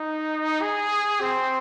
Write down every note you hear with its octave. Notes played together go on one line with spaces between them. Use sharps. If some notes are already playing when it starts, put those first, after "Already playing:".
Already playing: D#4
G#4
C4